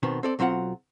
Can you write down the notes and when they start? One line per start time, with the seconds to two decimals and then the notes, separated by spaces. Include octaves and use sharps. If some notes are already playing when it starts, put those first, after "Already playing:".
0.03 B2 D#3 B3 C4
0.23 C4 A4 D5
0.39 B1 F#3 C4 F4 F#5